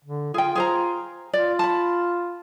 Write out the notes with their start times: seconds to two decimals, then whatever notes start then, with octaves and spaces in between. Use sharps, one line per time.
0.05 D3
0.34 F4 G#4 G5
0.55 G#4 C5 A#5
1.33 F4 D5
1.59 A5 B5